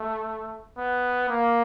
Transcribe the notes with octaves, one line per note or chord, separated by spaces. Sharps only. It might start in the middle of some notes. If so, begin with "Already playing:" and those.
Already playing: A3
B3
A#3